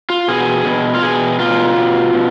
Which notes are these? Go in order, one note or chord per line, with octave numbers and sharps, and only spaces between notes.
F4
B2 G#4
B2
F4
B2 G#4
B2 F4
B2
B2